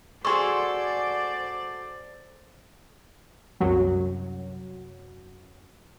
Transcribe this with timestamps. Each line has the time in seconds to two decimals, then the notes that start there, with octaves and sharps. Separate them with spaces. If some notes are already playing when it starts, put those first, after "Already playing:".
0.25 F#4 G#4 A4 C5 D5 C6 C#6
3.60 C2 F#2 F#3